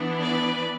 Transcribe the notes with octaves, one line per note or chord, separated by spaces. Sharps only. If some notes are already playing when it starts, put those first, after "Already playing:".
Already playing: E3 B3 D4
B4 D5